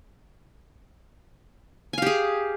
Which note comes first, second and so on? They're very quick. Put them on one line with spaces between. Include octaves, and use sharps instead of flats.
G#5 F5 G4 G#4